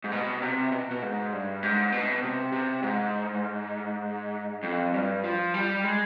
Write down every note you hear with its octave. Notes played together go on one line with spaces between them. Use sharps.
G#2
B2
C3
B2
B2
G#2
G2
G#2
B2
C3
C3
G#2
F2
G2
F3
G3
G#3